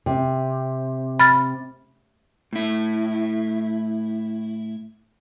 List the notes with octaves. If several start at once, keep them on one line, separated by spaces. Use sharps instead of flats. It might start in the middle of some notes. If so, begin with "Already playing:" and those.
C3
B5 F6 A6
A2 E4